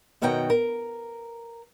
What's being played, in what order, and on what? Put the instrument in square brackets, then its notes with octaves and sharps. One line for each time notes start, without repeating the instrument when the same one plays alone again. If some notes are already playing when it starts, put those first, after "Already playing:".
[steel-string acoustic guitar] F#2 B2 D#3 F#4 G5 A#5
A#4